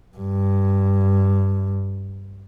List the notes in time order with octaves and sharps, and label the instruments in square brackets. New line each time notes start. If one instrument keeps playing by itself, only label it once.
[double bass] G2